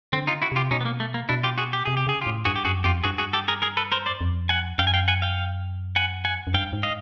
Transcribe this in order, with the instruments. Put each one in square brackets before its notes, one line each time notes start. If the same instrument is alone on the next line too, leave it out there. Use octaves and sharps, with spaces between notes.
[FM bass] D3 [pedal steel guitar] C4
[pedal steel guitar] D#4 F4
E4 F#4
[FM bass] C3 [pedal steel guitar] F4 G4
[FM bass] B2 [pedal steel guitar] C#4 D#4
[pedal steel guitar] B3
A#3
A3
A#3
[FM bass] B2 [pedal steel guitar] D4 E4
[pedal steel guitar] F4 G4
F#4 G#4
G4
[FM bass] C3 [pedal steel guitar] G#4
[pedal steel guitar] G4
[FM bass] C#3 [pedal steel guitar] G#4
[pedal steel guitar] F4 G4
[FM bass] A2
[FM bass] G2 [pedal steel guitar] F#4 G#4
[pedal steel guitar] G4
[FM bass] F#2 [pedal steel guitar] F#4 G#4
[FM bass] F2 [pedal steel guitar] F4 G4
[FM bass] G2 [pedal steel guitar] F#4 G#4
[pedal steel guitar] F#4 G#4
G4 A4
G#4 A#4
G#4 A#4
A4 B4
A#4 C5
C5 D5
[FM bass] F2
[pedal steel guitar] F#5 G#5
[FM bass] F#2 [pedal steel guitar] F5 G5
[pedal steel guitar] G#5
F5 G5
F#5 G#5
F5 G5
F#5 G#5
F#5 G#5
[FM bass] F#2
[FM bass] G2 [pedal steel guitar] F5 G5
[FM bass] G#2
[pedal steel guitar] D#5 F5